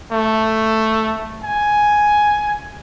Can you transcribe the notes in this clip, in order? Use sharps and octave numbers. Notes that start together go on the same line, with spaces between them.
A3
G#5